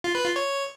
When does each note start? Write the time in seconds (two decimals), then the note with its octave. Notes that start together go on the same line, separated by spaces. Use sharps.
0.04 F4
0.15 B4
0.25 F4
0.36 C#5